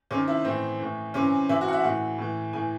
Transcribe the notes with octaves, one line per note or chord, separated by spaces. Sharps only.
C3 D#3 C#4
E4
A2 E3 C4
A2 E3
C3 E3 C#4
C3 E3 E4
F#4
F#5
E5
A2 E3 F#5
A2 E3
A2 E3 G#5